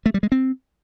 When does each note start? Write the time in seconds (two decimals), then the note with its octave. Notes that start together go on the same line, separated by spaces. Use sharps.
0.06 A3
0.14 G3
0.23 G#3
0.32 C4